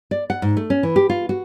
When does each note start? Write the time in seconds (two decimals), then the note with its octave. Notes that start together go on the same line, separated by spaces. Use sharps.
0.11 D5
0.30 F#5
0.42 G#2
0.57 A3
0.70 C#4
0.83 E3
0.96 G4
1.10 F4
1.29 F#4